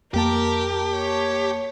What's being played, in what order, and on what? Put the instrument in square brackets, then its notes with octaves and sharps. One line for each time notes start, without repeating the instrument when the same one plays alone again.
[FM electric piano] F2 A#3 A5 [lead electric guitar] G4 [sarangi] A#4
[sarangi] C#5